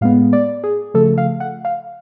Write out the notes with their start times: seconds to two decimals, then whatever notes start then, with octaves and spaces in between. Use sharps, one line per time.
0.01 A2 G#3 B3 F5
0.33 D5
0.64 G#4
0.94 C#3 F3 A3 A4
1.18 F5
1.40 F#5
1.65 F5